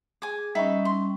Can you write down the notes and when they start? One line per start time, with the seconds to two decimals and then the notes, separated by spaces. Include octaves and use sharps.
0.22 G#4 G#5 D6
0.55 G3 C#4 D#4 E5 B5
0.85 C6